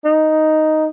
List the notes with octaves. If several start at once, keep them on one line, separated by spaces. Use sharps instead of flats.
D#4